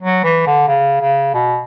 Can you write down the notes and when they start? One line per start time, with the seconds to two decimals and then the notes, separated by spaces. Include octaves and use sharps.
0.02 F#3
0.24 E3
0.46 D3
0.68 C#3
1.01 C#3
1.34 B2